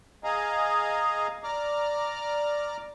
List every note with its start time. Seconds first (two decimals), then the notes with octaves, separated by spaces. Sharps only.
0.24 G#4 D#5 F5 G#5 A#5
1.44 D5 A#5 D6 F6